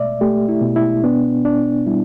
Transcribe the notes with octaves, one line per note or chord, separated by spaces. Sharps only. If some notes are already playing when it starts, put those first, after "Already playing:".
Already playing: B2 A3 D5 E5
A3 G4
E4
B2
E4
B3 D4
D4
G3 E4